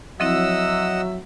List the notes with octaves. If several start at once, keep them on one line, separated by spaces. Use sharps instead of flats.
F3 F#3 C4 E4 D#5 E5 F#5 E6